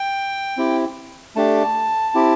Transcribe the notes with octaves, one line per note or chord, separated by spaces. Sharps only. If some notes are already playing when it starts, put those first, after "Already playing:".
Already playing: G5
C4 E4 G4
A3 D4 G4 A5
C4 E4 G4